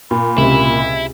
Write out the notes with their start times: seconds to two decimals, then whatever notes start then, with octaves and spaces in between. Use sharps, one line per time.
0.11 A#2 B5
0.38 C#2 C3 E4